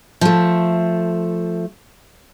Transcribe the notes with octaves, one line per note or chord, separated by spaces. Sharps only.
F3 A3